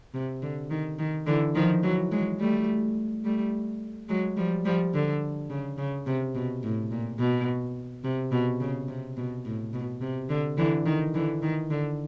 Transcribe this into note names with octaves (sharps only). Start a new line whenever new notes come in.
C3
D3
D#3
D#3
D3 E3
D#3 F3
E3 F#3
F#3 G#3
G3 A3
G3 A3
F#3 G#3
F3 G3
F3 G3
D3
C#3
C#3
C3
B2
A2
A#2
B2
C3
B2
C#3
C3
B2
A2
B2
C3
D3
D3 E3
D#3
D3 E3
D#3
D3